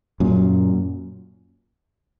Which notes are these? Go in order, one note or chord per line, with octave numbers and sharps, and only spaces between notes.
F#2 A#2